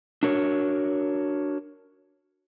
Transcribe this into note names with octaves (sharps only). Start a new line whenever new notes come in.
D4 F#4 A#4 C#5